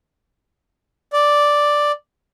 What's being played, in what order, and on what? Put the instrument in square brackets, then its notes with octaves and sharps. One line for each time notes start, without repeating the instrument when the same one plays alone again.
[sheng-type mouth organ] D5